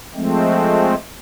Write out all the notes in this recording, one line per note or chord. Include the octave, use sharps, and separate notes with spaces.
F3 G#3 A3 C4